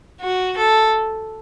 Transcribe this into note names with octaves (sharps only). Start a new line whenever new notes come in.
F#4
A4